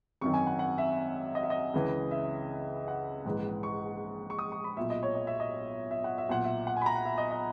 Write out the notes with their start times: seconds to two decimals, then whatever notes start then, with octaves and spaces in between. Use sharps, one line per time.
0.21 G#1 F#2 D#3 C#6
0.34 G#5
0.47 F#5
0.59 F#5
0.78 E5
1.35 D#5
1.43 E5
1.50 D#5
1.74 C#2 C#3 E3
2.11 E5
2.88 F#5
3.25 A#1 G#2 E3
3.63 C#6
4.30 C#6
4.39 D#6
4.52 C#6
4.64 B5
4.77 B1 A#2 E5
4.90 D#5
5.03 C#5
5.15 D#5
5.27 E5
5.40 D#5
5.91 E5
6.04 F#5
6.18 E5
6.29 B1 A#2 F#5
6.45 E5
6.67 F#5
6.77 G#5
6.81 B5
6.86 A#5
6.95 F#5
7.05 E5
7.18 D#5
7.31 D#5